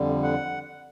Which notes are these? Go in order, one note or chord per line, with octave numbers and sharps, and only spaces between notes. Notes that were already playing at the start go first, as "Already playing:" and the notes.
Already playing: F2 D3 G3
F#5